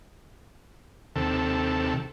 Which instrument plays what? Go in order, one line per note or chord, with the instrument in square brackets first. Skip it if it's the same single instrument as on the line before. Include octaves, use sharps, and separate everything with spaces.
[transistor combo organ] D#2 C3 A4